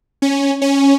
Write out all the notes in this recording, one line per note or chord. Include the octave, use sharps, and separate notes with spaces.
C#4
C#4